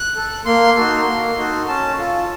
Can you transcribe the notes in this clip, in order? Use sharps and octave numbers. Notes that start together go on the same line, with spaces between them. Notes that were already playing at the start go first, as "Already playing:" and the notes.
Already playing: F#6
A4
A#3 C6
D#4 F#4 A4
A#3
D#4 F#4 A4
C#4 A5
F4 A4